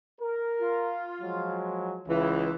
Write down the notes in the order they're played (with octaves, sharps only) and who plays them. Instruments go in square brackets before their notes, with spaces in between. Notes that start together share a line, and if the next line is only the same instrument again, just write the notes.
[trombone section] A#4
[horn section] F4
[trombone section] F3 F#3 G#3
[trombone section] C#2 [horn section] E3